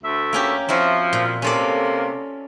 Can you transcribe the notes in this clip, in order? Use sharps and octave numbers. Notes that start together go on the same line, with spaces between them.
D2 A3 E5
A#3 C#4 G4
F3 C4 E4 F#4
A#2
C3 A#3 C#4 A4 D5